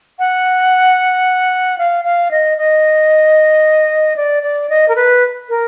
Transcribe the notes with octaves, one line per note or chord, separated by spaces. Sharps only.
F#5
F5
F5
D#5
D#5
D5
D5
D#5
A#4
B4
A#4